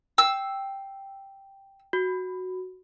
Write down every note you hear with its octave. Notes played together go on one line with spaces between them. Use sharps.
G5 E6
F#4